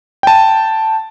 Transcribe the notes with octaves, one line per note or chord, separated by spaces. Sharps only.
G5 A5